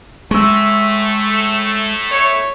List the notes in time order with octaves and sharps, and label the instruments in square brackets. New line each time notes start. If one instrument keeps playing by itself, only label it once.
[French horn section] A2 A3 [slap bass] G#3 [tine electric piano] C#6 E6
[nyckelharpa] C#5